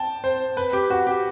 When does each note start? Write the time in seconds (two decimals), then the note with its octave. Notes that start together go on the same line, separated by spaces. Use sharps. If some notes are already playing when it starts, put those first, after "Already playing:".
Already playing: G5 A5
0.24 C5
0.57 B4
0.73 G4
0.90 F#4
1.07 G4